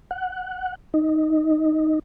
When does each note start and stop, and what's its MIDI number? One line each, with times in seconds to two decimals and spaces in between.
0.11 0.75 78
0.94 1.99 63